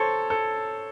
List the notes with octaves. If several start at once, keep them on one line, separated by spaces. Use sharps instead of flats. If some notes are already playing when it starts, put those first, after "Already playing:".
Already playing: A4 C5 C#5
A4